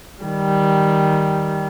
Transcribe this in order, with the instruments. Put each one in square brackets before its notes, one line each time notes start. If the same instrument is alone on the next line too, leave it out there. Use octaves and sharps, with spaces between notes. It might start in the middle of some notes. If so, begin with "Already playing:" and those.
[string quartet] D#3 G3